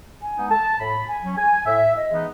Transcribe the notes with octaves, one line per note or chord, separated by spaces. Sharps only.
G#5
G#3 B3 D#4
A5
A2 B5
G#5
F#3 C#4
G#5
A2 E5
D#5
E3 G#3 B3 D#4